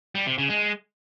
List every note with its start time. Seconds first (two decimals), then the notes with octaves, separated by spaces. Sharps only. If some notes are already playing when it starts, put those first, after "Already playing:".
0.15 G3
0.26 C3
0.38 C#3
0.50 G#3